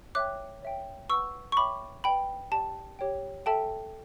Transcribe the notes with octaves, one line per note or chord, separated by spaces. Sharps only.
C#5 E5 G5 D6 F#6
C#5 E5 G5
B4 F#5 C#6 E6
C#6
C#5 E5 G5 B5 D6
B4 D5 G5 B5
G4 D5 G5 A5
G4 C#5 G5
A4 E5 G5 A5